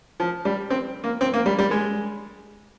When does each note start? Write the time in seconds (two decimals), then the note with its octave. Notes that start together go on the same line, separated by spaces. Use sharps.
0.20 F3
0.45 G3
0.70 C4
1.04 A#3
1.21 C4
1.34 A#3
1.46 G3
1.59 G3
1.71 G#3